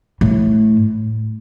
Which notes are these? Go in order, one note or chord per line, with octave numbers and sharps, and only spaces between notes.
A2